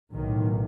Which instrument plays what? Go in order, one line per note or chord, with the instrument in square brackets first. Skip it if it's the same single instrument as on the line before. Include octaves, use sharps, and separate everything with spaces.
[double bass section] B1 A2 D#3